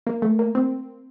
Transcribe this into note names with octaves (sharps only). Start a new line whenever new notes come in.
A#3
A3
A#3
C4